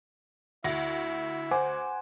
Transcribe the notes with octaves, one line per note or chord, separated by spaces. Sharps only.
D2 E4 E5 A#6
C5 F#5 G#5 D6